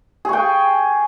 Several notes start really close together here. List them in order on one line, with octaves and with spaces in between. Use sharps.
G#4 C#6 G5